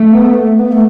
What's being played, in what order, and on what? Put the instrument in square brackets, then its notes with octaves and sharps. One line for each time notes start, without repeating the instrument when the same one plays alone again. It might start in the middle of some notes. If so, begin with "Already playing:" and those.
Already playing: [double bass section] A3
[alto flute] B3
A3
B3
A3